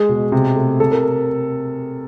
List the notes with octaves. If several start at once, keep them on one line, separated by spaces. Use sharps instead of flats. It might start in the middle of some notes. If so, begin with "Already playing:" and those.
Already playing: G#3 G#4
B2
C3
A3
C3 A4
A#4